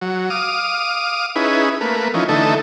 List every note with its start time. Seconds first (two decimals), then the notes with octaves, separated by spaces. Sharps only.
0.02 F#3
0.30 F5 D6 D#6
1.36 C#4 D#4 E4 G#4 B4
1.81 A3 A#3 B4
2.14 E3 F3 C#4 D#4
2.29 D3 E3 A3 D#4 A4